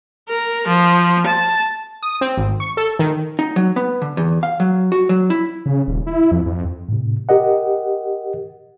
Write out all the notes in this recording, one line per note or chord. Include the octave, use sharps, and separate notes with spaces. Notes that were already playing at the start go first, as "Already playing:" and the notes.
A#4
F3
A5
D#6
C4
G#1
C#6
A4
D#3
D#4
F#3
B3
D3
E2
F5
F#3
F#4
F#3
E4
C#3
D#1
E4
F2
F2
A2 C3
G4 A#4 D#5 F#5